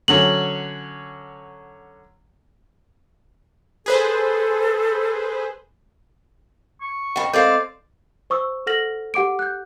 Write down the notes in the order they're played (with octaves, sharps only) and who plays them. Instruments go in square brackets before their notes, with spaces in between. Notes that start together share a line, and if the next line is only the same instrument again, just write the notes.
[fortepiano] D3 F#3 C#4 [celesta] F#7
[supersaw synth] G#4 B4 C5 [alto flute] A4
[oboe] C#6
[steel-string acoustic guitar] F2 C#3 [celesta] F#5 G5 B5
[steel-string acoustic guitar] G#3 C4 F5 [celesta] A4 G6 [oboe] D5
[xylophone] C5 C#6 D#6 E6
A4 F#5 F6 A#6 F#7
G4 F#5 D6 D7
F#6 G6